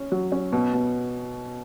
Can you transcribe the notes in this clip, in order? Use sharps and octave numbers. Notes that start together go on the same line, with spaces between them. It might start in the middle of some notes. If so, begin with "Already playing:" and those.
Already playing: C#4
F#3
C#4
B2
B2